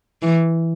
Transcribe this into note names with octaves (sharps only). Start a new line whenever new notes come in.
E3